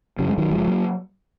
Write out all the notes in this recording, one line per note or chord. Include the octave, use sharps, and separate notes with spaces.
F#2 C#3 F#3
G#3
D#3 F#3
F#1 F3 G#3
F#3 A#3